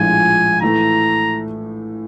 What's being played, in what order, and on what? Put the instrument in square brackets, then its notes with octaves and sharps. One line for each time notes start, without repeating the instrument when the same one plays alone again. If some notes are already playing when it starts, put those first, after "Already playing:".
Already playing: [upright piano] A#1 A2 F3 G#3 [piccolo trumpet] G#5
[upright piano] A2 E3 A3 [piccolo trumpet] A#5